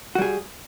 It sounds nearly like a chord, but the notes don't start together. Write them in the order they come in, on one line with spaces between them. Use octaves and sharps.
F#4 G3 G#4